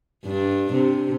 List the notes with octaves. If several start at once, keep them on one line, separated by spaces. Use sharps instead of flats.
G2 D4
C3